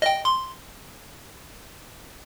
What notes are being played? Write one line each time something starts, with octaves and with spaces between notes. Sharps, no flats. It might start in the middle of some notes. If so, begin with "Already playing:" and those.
D#5 G5
C6